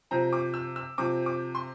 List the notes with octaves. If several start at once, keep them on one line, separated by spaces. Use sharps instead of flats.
C3 F3 C4 A#5
D6
E6
E6
C3 F3 C4 D6
D6
C6